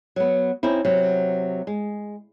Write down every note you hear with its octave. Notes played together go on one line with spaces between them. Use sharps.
F#3 B3
C4 C#4 D#4 E4
C3 F#3
G#3